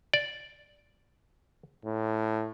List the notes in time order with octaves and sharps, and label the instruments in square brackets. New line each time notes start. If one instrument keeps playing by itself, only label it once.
[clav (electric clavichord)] D5
[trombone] A2